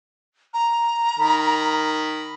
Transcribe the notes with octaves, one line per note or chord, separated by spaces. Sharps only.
A#5
D#3 A#4 B5